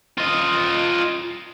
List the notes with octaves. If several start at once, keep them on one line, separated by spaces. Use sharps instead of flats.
F4 D#5